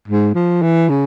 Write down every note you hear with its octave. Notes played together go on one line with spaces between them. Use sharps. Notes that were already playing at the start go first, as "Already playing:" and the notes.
G#2
F3
E3
C#3